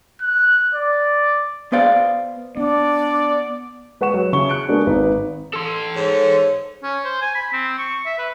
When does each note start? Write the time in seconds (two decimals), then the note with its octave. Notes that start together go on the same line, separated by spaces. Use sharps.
0.21 F#6
0.74 D5
1.72 B3 C5 D5 F5
2.57 B3 D4 D5
4.01 G#3 B4 F#5 C#6 E7
4.14 F#3
4.33 C#3 E4 C#6 G7
4.49 F#6 C#7 D7
4.68 G#3 A#3 B3 D4 F#4
4.86 G#1 D#4 B4
5.53 A4 C6
5.96 G#2 C#5
6.83 C#4
7.05 C5
7.21 G#5
7.35 B5
7.53 C4
7.78 C#6
8.05 E5
8.19 B4